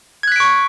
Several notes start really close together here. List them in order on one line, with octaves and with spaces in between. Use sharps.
G#6 F#6 B6 D7 C#6